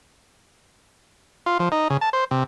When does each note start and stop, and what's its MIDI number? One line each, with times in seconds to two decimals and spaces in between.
1.46 1.58 65
1.59 1.69 53
1.72 1.88 63
1.90 1.97 49
2.01 2.10 81
2.13 2.24 72
2.31 2.43 48